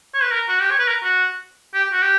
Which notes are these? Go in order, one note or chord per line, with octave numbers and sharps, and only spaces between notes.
C#5
B4
A#4
F#4
G4
C#5
B4
A#4
F#4
G4
F#4
G4